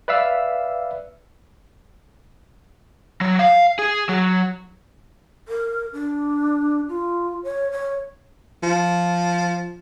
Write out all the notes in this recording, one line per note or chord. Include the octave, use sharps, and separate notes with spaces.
B4 D5 E5 F5 E6
F#3
F5
G#4
F#3
A#4
D4
F4
C#5
C#5
F3